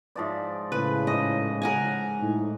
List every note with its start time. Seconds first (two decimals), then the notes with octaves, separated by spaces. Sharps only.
0.16 G#2 F3 D5
0.72 A2 C#3 B4
1.07 G#2 D#5
1.62 A#4 F#5 G#5
2.22 A2 D#4